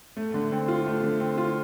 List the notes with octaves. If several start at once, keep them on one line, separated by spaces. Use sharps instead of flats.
A3
D3
C4
F4
A3
D3
C4
F4